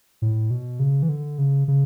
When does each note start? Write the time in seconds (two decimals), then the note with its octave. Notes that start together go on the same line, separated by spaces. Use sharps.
0.22 A2
0.50 B2
0.79 C#3
1.03 E3
1.09 D3
1.38 C#3
1.68 C#3